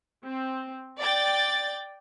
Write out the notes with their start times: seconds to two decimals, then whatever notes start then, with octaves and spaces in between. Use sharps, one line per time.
0.25 C4
0.98 D5 G5 A6